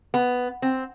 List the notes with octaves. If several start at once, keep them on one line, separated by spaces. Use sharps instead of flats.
B3
C4